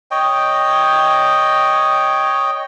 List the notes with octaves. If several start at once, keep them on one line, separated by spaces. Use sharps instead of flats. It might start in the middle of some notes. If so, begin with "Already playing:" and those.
C#5 D#5 G5